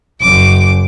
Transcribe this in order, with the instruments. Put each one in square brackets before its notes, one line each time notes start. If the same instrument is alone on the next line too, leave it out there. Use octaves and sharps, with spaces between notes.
[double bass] F#1 F#2 [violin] D6